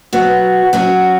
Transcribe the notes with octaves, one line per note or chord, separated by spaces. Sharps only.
F#3 B3 F#4
F#3 C#4 F#4